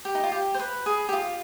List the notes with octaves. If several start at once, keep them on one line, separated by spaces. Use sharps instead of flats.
G4
D#4
F4
G4
C5
B4
G#4
G4
F4